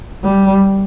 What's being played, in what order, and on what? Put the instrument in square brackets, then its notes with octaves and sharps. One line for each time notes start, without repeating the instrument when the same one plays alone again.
[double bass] G3